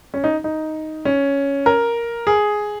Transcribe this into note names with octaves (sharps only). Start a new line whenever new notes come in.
C#4
D#4
D#4
C#4
A#4
G#4